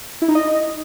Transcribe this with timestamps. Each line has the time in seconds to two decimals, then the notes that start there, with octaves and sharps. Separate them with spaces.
0.22 E4
0.28 D#4
0.35 D#5